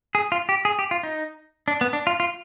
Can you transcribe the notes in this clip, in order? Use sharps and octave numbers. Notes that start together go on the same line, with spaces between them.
G#4
F4
G4
G#4
G4
F4
D#4
D4
B3
D4
F4
F4